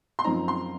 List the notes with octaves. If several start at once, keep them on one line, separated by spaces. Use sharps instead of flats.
C6
F#2 F3 C4 D#4 A#5
C6